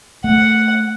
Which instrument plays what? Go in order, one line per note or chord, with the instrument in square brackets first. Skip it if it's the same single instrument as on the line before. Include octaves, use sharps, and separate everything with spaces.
[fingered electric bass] A3 [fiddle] F#5